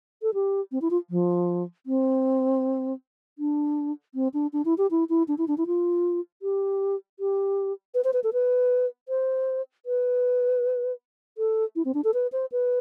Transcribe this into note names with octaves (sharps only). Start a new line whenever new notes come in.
A4
G4
C4
E4
F4
F3
C4
D4
C4
D4
D4
E4
G4
E4
E4
D4
E4
D4
E4
F4
G4
G4
B4
C5
B4
A4
B4
C5
B4
A4
E4
C4
D4
A4
B4
C5
B4